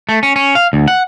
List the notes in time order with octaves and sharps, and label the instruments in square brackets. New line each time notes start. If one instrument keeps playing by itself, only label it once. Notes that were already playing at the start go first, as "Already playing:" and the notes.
[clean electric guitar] A3
C#4
C#4
F5
D2
F#5